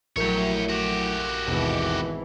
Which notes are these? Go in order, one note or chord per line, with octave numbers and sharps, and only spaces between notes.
A#1 F#3 A3 E4 G4 A#4 C#5
F#4 G4
G#1 D#2 B2 E3